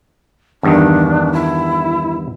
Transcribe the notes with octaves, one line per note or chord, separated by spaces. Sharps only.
E2 G2 D#3 D4
E4